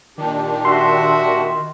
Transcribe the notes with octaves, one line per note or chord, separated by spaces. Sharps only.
A#2 D#3 D4 G4
F#4 E5 C6